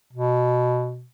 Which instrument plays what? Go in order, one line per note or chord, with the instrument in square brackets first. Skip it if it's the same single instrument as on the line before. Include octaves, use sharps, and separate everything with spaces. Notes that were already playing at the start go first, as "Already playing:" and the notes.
[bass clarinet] B2